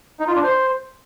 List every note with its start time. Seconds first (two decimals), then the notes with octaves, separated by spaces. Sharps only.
0.20 D#4
0.27 F4
0.35 D4
0.43 C5